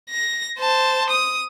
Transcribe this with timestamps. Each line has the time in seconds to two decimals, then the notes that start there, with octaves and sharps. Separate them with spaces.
0.10 A#6
0.59 C5 A5
1.10 D#6